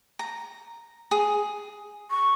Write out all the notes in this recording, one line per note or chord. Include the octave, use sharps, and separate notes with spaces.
A#5
G#4
C#6